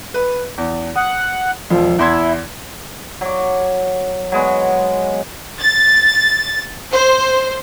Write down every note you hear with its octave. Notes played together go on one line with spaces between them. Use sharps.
B4
E2
F#5 D#6
E1 F3
E2 E4 C6 G#6
F#3 D6
F#3 G#3 B3
A6
C5